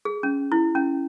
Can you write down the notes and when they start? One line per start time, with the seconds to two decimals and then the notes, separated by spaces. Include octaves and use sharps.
0.05 G#4
0.23 C#4
0.52 E4
0.75 C#4